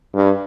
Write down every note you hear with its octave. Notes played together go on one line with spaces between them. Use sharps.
G2